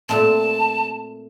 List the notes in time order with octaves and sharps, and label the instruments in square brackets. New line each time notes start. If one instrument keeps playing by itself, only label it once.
[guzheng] A#2 A3 C4 [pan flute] A5